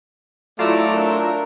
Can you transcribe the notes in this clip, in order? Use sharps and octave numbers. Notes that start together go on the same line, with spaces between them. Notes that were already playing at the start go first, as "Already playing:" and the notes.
F#3 A3 E4 F4 D5 A#5 D6 E6
D4 A#4